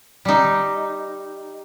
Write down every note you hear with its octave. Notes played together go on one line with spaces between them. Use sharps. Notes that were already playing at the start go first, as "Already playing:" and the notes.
G3 D#4